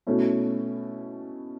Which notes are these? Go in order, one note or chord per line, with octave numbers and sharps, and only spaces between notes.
B2 A3 C#4 E4